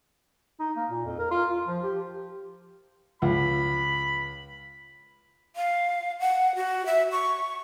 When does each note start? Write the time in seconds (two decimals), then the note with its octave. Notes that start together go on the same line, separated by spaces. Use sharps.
0.60 D#4
0.76 A#3
0.90 A#2
1.05 F2
1.19 A#4
1.31 F4
1.49 F4
1.67 F3
1.83 G4
3.22 C#2 B5
5.55 F5
6.20 F#5
6.55 F#4
6.86 E5
7.11 C#6